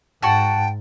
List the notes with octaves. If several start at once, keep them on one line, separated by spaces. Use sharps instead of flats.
G#2 F#4 G5 A5